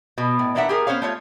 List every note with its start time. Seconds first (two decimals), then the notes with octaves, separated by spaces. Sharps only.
0.18 B2
0.39 A2
0.55 E3 A#3 D4 E5 F#5
0.69 G4 G#4 A#4
0.87 B3 C#4 C5 C#5 F5
1.02 A3 F4 C#5